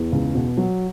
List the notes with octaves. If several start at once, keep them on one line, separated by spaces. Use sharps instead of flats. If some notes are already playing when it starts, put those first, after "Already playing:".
Already playing: E2
C#2
B2
F#3